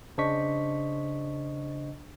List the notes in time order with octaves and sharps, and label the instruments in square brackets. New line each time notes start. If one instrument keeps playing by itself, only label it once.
[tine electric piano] C#3 D4 C5 D#5 C#6 B6